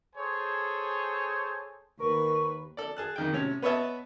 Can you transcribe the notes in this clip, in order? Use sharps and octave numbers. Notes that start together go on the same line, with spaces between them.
G#4 A4 C5 C#5 G#5
D#2 A#4 B4 C#6
A4 D5
G#4 A5 F#6
F2 D#3 G5
A2 C3 C#4
B3 B4 C#5 D#5 E5 A5